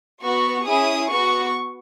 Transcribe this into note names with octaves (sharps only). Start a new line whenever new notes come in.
B3 F#4 C#6
C#4 E4 G#4 D#6
B3 F#4 C#6